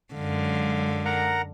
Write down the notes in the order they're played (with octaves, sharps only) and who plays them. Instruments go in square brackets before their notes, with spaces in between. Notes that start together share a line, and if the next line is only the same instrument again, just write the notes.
[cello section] F#2 G#3 F5 [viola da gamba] D3
[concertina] A#4 F#5 A#5